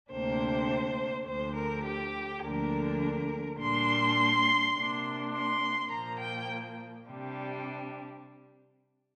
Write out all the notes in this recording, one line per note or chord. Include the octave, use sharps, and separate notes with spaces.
D2 C3 A#3 D4 C5
D2 D3 F3 C5
A#4
G4
D2 D3 F3 A#3 D4 A#4
A#2 G3 D4 C6
C3 A#3 D4
C6
A#2 F3 A#3 A#5
G5
C3 G3 D4